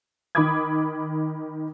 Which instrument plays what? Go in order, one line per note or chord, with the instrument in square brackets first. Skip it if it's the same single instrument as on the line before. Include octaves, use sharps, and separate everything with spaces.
[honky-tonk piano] D#3 B5 D6 D#6 G#6